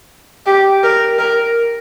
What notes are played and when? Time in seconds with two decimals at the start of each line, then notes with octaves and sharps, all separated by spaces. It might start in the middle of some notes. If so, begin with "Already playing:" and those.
0.46 G4
0.83 A#4
1.19 A#4